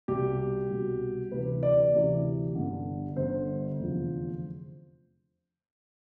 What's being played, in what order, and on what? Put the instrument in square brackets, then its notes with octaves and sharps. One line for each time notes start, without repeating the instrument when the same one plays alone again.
[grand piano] C2 B2 G4
C2 B2
D2 C3 E3 B4
D5
D2 C3 E3
G1 G2 D3
G1 G2 D3 C5
F1 E2 D3 F3